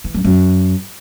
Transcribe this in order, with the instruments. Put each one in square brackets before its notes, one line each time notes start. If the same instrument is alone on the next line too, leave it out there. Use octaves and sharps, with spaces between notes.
[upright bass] E3
F#2
F#2